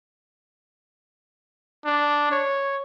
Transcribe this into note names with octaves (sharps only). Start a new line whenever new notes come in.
D4
C#5